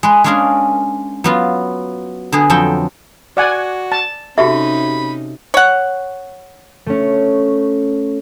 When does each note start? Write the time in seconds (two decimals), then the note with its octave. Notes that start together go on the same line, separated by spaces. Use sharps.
0.03 G#3 B4
0.24 G#3 A#3 C#4 D4 G#4 A#4
1.24 F#3 B3 F4
2.32 D3 B3 G#4
2.50 F2 F#3 A4 G5
3.37 F#4 D5 F#5 G#5
3.92 A5
4.38 C3 C#4 D#4 F#4 G4 A4 E5 B5
5.54 C#5 F#5
6.86 A3 C#4